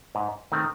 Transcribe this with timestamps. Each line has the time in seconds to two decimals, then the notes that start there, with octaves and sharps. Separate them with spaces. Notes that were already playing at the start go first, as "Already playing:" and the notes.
0.15 G#2
0.52 D#3 A3 C4